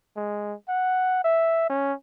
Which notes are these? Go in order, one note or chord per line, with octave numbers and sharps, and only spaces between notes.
G#3
F#5
E5
C#4